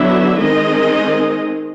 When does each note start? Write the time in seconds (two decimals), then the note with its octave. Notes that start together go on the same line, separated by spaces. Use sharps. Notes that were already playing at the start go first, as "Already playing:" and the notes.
Already playing: D3 F#3 B3 D4 E4 E5
0.39 D#3 G#3 C4 D#4 D#5